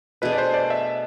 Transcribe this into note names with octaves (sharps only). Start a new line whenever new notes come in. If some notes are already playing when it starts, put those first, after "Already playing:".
B2 A3 D4 G#4 B4
D5
C5
D5
E5